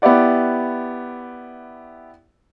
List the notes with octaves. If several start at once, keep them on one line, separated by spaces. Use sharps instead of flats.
B3 E4 G4 D5 F#5